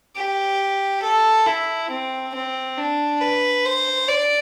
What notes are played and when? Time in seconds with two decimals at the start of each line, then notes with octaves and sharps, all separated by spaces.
0.16 G4
1.03 A4
1.46 E4
1.90 C4
2.34 C4
2.78 D4
3.21 B4
3.65 C5
4.08 D5